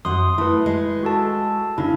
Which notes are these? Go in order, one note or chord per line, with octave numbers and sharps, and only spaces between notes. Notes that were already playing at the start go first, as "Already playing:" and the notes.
F#2 F#5 C6 D#6
A3 E4 B4
G#3
F#4 A4 A5
C#3 D4 E4